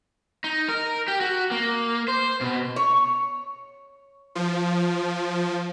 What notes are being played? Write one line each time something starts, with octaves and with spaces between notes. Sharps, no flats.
D#4
A#4
G4
F#4
A#3
C5
B2
C#5
F3